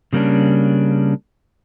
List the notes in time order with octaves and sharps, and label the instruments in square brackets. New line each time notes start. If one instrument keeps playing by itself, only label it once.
[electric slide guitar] C#3 G3 A#3 C#4 D4